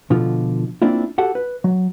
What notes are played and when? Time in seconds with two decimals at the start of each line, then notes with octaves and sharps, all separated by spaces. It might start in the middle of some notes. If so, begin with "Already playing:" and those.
0.10 B2 D3 F3 F4
0.82 A#3 C4 D4 E4 F4
1.18 F#4 G4 A4 F#5
1.35 B4
1.64 F#3